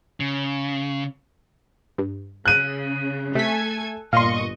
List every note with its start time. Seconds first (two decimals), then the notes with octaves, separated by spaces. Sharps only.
0.20 C#3
1.98 G2
2.45 C#3 F#6 D#7
3.35 C3 A3 A4 G#5 G#6 B6
4.13 G1 A#2 D#5 F5 C6 C#6